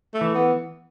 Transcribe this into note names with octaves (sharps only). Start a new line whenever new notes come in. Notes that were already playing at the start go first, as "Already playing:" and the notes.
A3
E3
B3